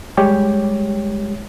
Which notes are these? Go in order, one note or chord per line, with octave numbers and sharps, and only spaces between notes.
G3 G#3 G4 C#5